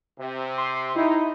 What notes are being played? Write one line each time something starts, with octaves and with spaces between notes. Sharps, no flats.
C3
C6
D#4 E4